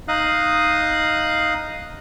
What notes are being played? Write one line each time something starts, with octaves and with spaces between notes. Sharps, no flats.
D#4 D#5 F5 D#6 F#6